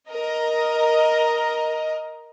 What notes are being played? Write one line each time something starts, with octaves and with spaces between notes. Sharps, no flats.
A#4 D#5 A#5